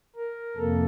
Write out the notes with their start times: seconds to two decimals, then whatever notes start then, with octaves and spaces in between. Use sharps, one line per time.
0.16 A#4
0.56 F2 C3 A#3 A4